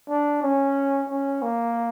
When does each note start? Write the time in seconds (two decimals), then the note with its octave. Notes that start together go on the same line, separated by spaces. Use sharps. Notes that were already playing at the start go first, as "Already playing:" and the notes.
0.09 D4
0.42 C#4
1.08 C#4
1.42 A#3